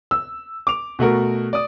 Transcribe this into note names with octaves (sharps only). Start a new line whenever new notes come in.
E6
D6 F7
B2 A3 F#4 A#4
D5 D#6